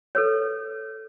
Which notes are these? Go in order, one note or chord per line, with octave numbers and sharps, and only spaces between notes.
A4 B4 C#5